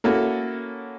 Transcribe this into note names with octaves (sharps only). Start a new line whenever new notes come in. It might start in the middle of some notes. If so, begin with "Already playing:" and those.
A#3 C#4 E4 F#4 A4